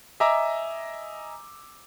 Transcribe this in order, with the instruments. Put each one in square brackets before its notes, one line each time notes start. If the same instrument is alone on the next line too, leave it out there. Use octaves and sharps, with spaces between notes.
[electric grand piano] D#5 E5 G#5 A#5 D6 E6